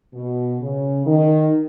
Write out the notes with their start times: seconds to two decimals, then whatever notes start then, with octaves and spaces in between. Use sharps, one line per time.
0.13 B2
0.60 C#3
1.06 D#3